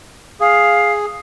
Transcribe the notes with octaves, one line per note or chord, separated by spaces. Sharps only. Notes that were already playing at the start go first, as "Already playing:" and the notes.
G#4 F5